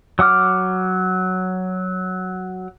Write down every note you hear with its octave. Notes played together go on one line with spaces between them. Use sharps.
F#3 F#5 D6 F6